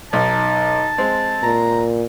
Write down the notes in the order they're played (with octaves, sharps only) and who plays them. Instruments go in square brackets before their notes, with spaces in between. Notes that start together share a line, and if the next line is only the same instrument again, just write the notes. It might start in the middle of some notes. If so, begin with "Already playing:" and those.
[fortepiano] B1 [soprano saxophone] D#4 [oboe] A5
[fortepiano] G#3 C4
[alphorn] A#2 [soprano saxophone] A#5